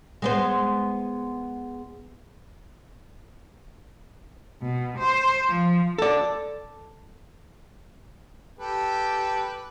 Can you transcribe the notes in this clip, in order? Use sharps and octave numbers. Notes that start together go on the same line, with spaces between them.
G#3 B3 C5
B2
C5
F3
A4 D5
G4 A4 B4